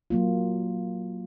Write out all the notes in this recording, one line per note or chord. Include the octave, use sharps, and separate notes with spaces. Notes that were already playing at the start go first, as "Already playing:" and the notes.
F#3 A#3 F4